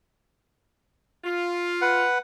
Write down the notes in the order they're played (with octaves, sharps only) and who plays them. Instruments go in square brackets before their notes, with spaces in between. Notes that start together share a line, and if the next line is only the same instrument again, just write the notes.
[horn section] F4
[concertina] B4 F#5